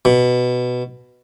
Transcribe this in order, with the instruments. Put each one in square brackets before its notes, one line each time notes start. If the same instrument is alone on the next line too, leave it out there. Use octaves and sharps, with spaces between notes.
[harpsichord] B2